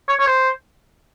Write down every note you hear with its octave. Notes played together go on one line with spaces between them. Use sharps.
C#5
C#5
C5